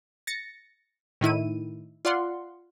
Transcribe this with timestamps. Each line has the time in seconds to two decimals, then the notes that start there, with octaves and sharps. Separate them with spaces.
0.27 A6 A#6 C#7
1.21 A2 D#3 E4 D#7
2.05 F4 D5 F#5 C6